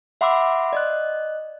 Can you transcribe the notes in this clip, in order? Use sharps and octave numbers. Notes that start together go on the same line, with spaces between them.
E5 F#5 B5 C6 D6 E6
D5 D#5 F#6